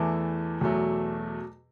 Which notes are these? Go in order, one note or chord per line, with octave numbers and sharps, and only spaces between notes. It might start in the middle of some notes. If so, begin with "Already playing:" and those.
Already playing: E2 E3 A3 A5 D6
E2 B2 F#3 A3